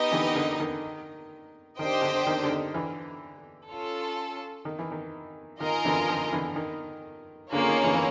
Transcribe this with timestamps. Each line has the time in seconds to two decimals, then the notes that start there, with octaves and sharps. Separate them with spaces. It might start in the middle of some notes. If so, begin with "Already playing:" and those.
Already playing: B3 D#4 G4 A#4 D#5
0.11 D3 E3
0.35 D3
0.60 D#3
1.79 D#3 D4 G4 C5 D#5 G5
2.02 D3
2.27 D#3
2.43 D3
2.49 D#3
2.74 D3 E3
3.70 C#4 F4 A4
4.65 D#3
4.79 E3
4.92 D#3
5.60 D#3 F4 A#4 D#5 G#5
5.85 D3 E3
6.08 D#3 F3
6.33 D3 E3
6.56 D#3
7.52 D3 A#3 C#4 F4 G#4 C#5
7.68 D#3
7.84 D3 E3
7.94 E3